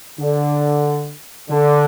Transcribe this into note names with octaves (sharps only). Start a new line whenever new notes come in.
D3
D3